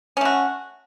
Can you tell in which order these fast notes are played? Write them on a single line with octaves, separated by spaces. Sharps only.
C#4 A3 F#4